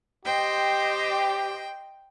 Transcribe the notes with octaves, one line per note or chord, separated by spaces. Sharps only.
G4 C5 D#5 G5